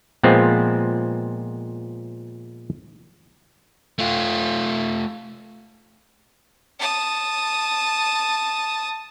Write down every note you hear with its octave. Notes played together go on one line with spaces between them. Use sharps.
A#2 F3 G#3 B3 C4 F4
A3 F4
A5 D#6